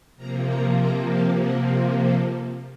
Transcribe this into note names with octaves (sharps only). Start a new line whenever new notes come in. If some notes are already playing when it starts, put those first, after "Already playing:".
C3 F3 A#3 A#5
A#5
A#5
A5
F#5
C5
A4